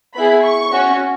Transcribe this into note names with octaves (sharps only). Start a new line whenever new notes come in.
B3 E4 G#4 B5
C#6
C#4 F#4